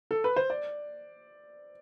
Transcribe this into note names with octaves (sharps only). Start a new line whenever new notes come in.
A4
B4
C5
D5